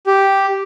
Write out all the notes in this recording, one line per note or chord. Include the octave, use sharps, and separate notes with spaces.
G4